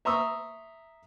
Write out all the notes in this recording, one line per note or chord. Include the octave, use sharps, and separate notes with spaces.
E5 A#5 C6 C#6 D#6 E6